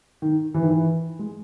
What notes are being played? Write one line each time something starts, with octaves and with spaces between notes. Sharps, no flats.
D#3
E3
D#3
E3
G#3